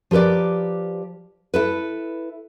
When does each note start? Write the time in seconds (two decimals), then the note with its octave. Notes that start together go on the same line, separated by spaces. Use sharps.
0.11 F3 G4 A#4 B4 D5
1.54 E4 A4 B4